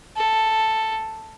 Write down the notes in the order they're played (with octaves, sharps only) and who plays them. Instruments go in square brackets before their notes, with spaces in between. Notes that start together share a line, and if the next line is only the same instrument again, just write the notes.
[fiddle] A4